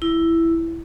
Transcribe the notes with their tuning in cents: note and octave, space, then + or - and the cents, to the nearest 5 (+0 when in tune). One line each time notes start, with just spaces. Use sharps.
E4 +5